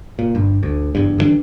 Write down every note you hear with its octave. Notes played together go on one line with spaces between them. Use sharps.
A#2
G1 G2
D2
F#1 E2 G2
D3 E3 G3 D4